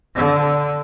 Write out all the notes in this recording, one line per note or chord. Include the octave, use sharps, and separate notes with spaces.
D3